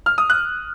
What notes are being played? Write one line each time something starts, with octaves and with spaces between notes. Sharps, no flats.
F6
D#6
F#6